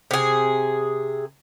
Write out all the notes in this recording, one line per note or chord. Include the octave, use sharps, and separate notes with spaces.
C3 G#4